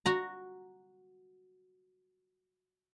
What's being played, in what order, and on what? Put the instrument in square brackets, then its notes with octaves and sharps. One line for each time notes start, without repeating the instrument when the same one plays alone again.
[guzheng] F#4 A#5